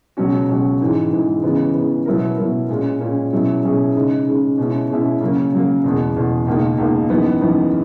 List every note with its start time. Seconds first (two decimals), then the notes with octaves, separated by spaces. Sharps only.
0.17 C#2 B2 F#3 C#4 F#4
0.49 C#2 B2 F#3 C#4 F#4
0.81 G#2 E3 G#3
1.12 G#2 E3 G#3
1.43 C#3 E3 G#3 B3
1.74 C#3 E3 G#3 B3
2.06 B2 F#3 B3 E4 A#4
2.37 B2 F#3 B3 E4 A#4
2.69 A#2 G#3 C#4
3.00 A#2 G#3 C#4
3.32 B2 F#3 C#4 E4 G#4
3.64 B2 F#3 C#4 E4 G#4
3.95 C#3 G#3 D#4
4.27 C#3 G#3 D#4
4.58 B2 G#3 C#4 E4
4.90 B2 G#3 C#4 E4
5.21 C#3 F#3 A#3
5.53 C#3 F#3 A#3
5.84 E2 B2 G#3
6.16 E2 B2 G#3
6.46 C#2 B2 A#3 D#4
6.78 C#2 B2 A#3 D#4
7.10 F#2 E3 B3 D#4
7.41 F#2 E3 B3 D#4